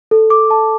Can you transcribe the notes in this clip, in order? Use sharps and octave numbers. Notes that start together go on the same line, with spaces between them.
A4
D6
A5